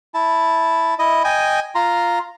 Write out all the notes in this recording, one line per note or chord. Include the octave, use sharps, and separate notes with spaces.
E4 A5
E4 D#5
D#5 G5 G#5
F4 A#5 C6